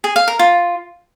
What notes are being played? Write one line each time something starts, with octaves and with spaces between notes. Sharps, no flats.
G#4
F5
A#4
F4